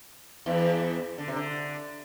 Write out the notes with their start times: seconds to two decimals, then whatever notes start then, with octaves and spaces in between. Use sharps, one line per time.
0.46 E2 E3
1.18 D3
1.28 C3
1.36 D3